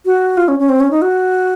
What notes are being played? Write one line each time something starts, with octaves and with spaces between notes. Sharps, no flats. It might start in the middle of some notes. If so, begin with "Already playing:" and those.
F#4
F4
C#4
C#4
C4
C#4
D#4
F#4